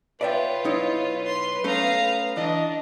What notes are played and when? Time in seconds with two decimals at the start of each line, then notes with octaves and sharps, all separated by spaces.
0.21 F4 B4 C#5 D5 E5 G5
0.65 B1 D#4 E4
1.23 C#5 C6
1.64 A3 B3 C#4 F5 A#5
2.37 E3 D4 D#5